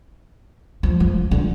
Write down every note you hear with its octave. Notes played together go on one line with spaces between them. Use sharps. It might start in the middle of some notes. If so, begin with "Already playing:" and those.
F3
F3
D3